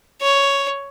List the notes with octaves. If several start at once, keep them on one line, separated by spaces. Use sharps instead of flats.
C#5